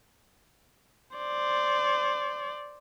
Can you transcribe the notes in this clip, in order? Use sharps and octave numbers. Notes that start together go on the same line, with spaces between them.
C5 D5